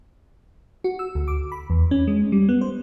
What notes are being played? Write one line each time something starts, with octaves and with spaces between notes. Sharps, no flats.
F#4
E6
D2
D6
B5
E2
C#4
G#3
G3
B3
C5